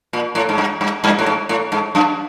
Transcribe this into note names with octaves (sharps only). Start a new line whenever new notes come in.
A#2
A2
G#2
G2
G2
G2
A2
G#2
A2
G#2
F#2